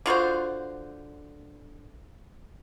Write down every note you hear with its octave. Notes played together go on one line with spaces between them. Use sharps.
D3 F4 F#4 C5